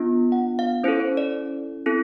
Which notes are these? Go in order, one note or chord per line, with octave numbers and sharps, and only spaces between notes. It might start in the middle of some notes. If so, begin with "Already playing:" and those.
Already playing: B3 D4 F4
F#5
F5
C#4 E4 A4 C5
C5
D5
C4 E4 A4